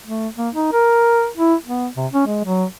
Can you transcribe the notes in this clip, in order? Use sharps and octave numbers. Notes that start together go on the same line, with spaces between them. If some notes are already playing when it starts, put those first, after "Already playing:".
A3
A#3
D#4
A#4
E4
B3
C3
C#4
G#3
F#3